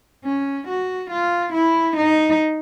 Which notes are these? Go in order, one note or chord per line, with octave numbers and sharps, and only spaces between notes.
C#4
F#4
F4
E4
D#4